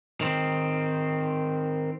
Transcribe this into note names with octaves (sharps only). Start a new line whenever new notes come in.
D#3 C4